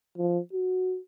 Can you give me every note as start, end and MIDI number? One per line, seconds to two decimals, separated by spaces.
0.18 0.39 53
0.53 0.99 66